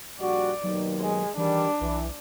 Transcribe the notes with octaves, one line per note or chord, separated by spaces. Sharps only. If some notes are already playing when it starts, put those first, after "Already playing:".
A#1 G3 F#4 D5
D#2 B2 D#3 F#3
G#3
D#3 E3 G3 D4
B1 E3